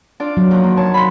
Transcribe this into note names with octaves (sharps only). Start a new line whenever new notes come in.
D4 F4 D5
F#3
D#2 F3
A#3
C#5 A5
B5 C6